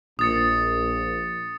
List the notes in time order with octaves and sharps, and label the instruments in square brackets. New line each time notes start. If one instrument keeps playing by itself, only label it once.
[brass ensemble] A#1 [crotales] D#6 A6 C#7